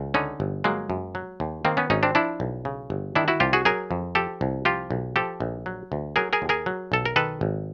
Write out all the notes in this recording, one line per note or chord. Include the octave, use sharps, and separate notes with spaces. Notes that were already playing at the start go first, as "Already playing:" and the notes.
Already playing: C#2
D3 C#4 D#4
G1
F#3 G#3 A#3
F#2
F#3
D#2
D#3 A#3 C4
B3 C#4
G#1 C#4 D#4
C4 D4
F3 D4 E4
B1
C#3
G1
D#3 D4 E4
E4 F#4
C2 F4 G4
F#4 G#4
F#3 G#4 A#4
F2
F3 G4 A4
C2
F3 F4 G4
B1
F3 G4 A4
A#1
F#3
D2
F#3 G#4 A#4
G#4 A#4
D#2
G#4 A#4
F#3
B1 A4
A#4
D#3 A4 B4
G#1